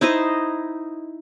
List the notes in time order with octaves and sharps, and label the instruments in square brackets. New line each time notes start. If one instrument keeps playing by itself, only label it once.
[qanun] D#4 E4 C5 D#5